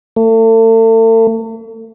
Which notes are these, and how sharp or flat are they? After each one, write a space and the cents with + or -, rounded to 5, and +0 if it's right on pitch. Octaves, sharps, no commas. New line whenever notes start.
A3 +40